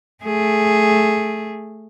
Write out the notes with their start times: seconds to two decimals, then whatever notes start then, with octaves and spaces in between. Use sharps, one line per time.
0.24 A3 G#4